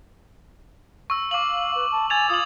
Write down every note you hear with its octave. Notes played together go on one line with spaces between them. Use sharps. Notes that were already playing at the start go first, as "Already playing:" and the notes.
C#6 E6
F5 D6 F#7
B4
A5
G#5 G#6 A6 F7
F4 D#6 F#7